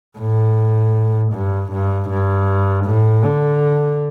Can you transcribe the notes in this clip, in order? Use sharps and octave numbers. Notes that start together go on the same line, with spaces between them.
A2
G2
G2
G2
A2
D3